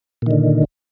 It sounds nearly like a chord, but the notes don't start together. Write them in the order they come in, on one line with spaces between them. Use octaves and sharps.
A#2 D#3 D3